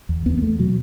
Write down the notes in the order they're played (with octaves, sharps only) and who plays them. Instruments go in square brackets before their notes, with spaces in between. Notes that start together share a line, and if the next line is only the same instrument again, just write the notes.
[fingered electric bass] E2
E2 B3
B3
E2 A3
B2 F#3